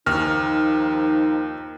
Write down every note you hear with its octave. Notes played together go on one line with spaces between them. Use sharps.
D#2 D#3 F3 D#4 F6